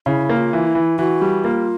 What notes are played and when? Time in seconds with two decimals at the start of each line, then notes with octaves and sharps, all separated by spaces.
0.06 C#3 E4
0.29 A#3
0.37 F4
0.53 E3
0.67 E4
0.75 E3
0.99 E3 F#4
1.21 G3
1.44 A#3 F4